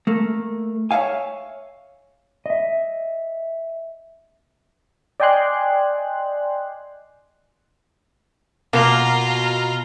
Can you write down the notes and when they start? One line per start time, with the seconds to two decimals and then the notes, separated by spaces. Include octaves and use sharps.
0.07 A3 A#3
0.91 C#5 D5 E5 F5 G#5
2.46 D#5 E5
5.20 D5 D#5 G5 G#5 C6 F#6
8.73 B2 A#3 F4 A#5